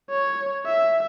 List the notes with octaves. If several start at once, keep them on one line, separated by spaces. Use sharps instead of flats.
C#5
E5